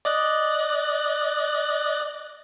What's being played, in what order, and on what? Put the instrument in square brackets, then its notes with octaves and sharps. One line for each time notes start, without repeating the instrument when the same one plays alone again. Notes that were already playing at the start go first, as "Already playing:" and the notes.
[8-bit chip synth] D5 D#5 F#6